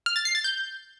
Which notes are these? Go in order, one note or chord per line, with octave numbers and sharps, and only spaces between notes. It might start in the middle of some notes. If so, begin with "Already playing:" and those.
F6
A6
C7
A6
G6